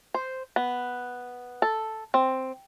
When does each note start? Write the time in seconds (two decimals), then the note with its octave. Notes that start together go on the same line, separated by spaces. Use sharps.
0.14 C5
0.56 B3
1.62 A4
2.14 C4